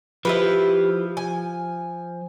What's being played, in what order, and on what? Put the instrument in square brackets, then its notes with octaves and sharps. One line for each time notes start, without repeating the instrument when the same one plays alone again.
[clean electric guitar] F3 [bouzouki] E4 G4 B4
[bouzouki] G#5